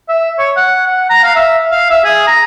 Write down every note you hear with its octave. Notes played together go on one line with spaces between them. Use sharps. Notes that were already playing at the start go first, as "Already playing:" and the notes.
E5
C#5
F#5
F#5
A#5
F5
E5
F5
E5
G#4
A#5